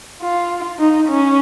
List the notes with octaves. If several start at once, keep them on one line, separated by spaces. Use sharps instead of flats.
F4
D#4
C#4